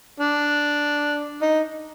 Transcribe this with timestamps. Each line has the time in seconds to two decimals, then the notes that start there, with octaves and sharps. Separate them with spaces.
0.20 D4
1.42 D#4